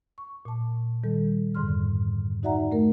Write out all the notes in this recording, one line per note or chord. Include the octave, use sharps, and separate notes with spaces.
C#6
A#2 A5
D#3 G3 A4
F2 G#2 D3 C6 F6
D#4 F#4 D5 E5 F#5 A#5
A3 A#4